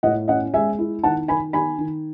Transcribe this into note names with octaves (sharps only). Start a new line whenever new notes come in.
A2 D#5 F#5
C#4 D#5 F#5
G#3 E5 G#5
E4
D#3 F#5 A5
D#3 G#5 B5
D#3 G#5 B5
D#3